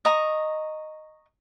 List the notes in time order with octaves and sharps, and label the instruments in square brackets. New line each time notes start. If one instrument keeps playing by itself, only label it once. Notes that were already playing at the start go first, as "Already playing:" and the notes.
[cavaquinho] D#5 A#5 C#6